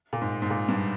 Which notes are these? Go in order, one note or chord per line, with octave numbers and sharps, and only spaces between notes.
A#2
G#2
G#2
A#2
G2